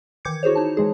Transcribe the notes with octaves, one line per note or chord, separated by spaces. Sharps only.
D#3 E3 D6 G6 G#6 C#7
E4 F#4 G#4 C5 C#5
D#4 A5
E3 G#3 G#4